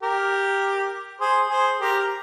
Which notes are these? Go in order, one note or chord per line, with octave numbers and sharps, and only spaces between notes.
G4 A#4
G#4 C5
G#4 C5
G4 A#4